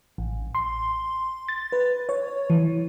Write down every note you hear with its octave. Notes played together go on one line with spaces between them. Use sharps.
A1
C6
A6
B4
C#5
E3